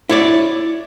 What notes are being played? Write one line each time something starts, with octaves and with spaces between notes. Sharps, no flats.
E4 C#5 D5